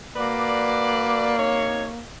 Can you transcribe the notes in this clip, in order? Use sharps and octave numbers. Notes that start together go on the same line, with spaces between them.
A#3 F#4 B4 D5
C3 D#4 C#5